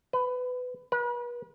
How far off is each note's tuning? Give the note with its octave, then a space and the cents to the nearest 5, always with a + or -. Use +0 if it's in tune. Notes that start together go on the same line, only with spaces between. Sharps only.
B4 +20
B4 -40